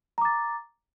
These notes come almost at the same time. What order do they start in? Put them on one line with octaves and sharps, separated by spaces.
A#5 D6 A6